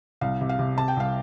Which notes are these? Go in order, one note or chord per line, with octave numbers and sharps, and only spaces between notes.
C2 F5
C3
F5
C3
C3 A5
G5
C2 F5